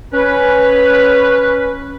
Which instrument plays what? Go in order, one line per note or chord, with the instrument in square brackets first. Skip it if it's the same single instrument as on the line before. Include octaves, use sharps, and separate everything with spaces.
[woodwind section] C#4 B4